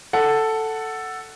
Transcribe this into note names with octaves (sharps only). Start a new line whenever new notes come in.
A4 F#5